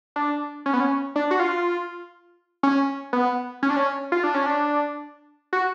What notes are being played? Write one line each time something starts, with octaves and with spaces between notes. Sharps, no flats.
D4
C#4
B3
C#4
D4
F#4
F4
C#4
B3
C#4
D4
C#4
F4
D4
C#4
D4
F#4